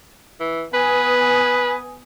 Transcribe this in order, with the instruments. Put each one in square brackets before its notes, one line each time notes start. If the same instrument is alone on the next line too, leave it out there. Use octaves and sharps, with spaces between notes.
[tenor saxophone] E3
[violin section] B3 G#5 D#6 [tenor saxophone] B4